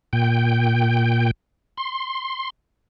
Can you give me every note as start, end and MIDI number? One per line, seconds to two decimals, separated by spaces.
0.13 1.31 46
0.13 1.31 79
1.77 2.50 84